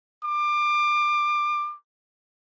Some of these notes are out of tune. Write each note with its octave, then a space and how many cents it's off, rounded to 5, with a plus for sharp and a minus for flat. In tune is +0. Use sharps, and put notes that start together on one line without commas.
D6 +25